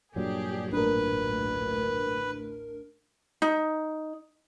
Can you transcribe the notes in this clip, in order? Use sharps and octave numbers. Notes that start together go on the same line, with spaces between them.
G2 A#2 F#3 D4 G4 G#4
A1 D2 D4 A#4 B4
D#4